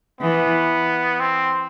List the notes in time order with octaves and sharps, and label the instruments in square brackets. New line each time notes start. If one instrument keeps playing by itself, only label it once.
[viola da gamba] E3 [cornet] B3
[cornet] C4